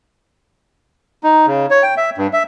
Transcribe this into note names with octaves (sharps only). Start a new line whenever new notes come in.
D#4
C#3
C#5
G5
E5
G2
E5